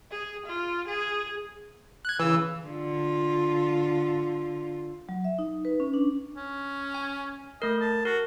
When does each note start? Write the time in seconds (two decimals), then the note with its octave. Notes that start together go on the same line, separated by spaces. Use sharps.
0.11 G#4
0.46 F4
0.88 G#4
2.05 F#6 G#6
2.20 C#3 E3 E6
2.65 D3 F4
5.09 F#3
5.24 E5
5.39 D#4
5.65 B4
5.80 C#4
5.94 D4
6.36 C#4
6.94 G#5
7.62 A3 A#4 D#5
7.81 A5
8.05 F#4 A#4